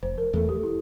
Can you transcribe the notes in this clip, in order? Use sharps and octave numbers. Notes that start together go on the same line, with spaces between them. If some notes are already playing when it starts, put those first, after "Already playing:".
F1 C5
A#4
E2 E3 A3 A4
G4
E4